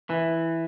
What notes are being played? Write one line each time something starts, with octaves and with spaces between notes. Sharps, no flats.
E3